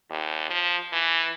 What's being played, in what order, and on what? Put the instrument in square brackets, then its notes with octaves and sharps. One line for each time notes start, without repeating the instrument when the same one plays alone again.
[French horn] D#2
F3
E3